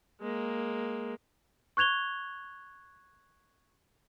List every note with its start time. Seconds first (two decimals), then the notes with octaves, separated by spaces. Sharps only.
0.21 G#3 A#3
1.77 C#6 F#6 G#6 F7 G7